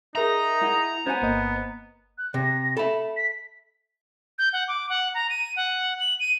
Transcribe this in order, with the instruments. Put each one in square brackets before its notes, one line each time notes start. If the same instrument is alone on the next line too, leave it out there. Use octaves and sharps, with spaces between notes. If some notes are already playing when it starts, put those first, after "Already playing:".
[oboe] D#4 [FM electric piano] G#4 A#4 E5 [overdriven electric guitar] A#5
[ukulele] E4 F#5
[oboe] B3 [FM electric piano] C#4 [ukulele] C5 F#5 G#5
[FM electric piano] G1 A#3 D#5
[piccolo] F#6
[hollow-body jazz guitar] C3 [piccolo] A#6
[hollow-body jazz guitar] A4 E5 [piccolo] B5
[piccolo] B6
G6
F#5
D6
F#5
A#5
D#7
F#5
F#7
D#7